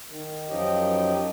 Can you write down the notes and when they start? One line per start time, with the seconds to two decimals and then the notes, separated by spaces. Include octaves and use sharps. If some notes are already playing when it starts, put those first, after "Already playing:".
0.07 D#3
0.48 F#2 F3 F#3 D#4 G4 D#5